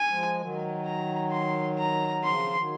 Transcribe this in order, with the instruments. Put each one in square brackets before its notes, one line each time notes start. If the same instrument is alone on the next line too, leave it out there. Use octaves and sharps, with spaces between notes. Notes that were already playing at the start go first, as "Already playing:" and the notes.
Already playing: [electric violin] G#5
[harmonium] F3 G#3
D#3 F#3
[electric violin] A#5
C6
A#5
[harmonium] C#3 F3 [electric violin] C6
[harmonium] D#3 F#3